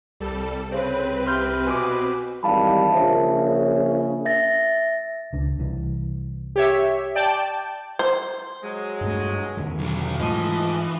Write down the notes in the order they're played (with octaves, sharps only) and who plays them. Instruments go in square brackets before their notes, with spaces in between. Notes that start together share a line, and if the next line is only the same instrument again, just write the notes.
[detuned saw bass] C2 [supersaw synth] G3 A4
[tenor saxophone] C#3 [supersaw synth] C4 B4 [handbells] C5
[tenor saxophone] C3 [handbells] C6 F6 G6
[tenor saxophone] B2 [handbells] G#5 D6
[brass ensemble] G#1 E3 G3 [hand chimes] F5 A5 B5
[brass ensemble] A#1 C#3 [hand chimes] C5 E5
[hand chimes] E5 A6 A#6
[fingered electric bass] C#2 D4
C2 E3
[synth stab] G4 C#5 E5
D5 G5 A5
[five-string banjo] C5
[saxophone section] F#3 G#3
[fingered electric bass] G2 A3
E2 D3 D#3
[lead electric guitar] B1 F#3
[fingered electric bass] G#2 G#3 A3 [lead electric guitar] E3 [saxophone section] F3 D#5